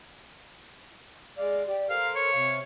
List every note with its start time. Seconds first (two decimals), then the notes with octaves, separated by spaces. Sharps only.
1.38 G#3 D5 F5
1.68 G4 D5
1.90 A4 A#4 C5 F5
2.15 C#5
2.33 C3 F5